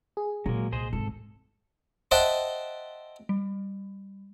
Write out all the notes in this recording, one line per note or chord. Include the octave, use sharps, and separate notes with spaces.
G#4
A#2 F#3 G#3 A#3
C2 G#4 C5 D#5
G#1 A4
C5 D#5 E5 F#5 G5 A5
G3